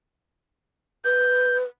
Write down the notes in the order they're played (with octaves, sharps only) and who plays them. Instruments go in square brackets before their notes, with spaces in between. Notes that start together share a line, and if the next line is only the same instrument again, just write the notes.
[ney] B4 [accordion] G6